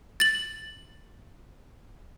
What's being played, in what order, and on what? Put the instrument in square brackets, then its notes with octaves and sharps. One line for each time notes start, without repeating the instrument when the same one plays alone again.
[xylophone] A6 F#7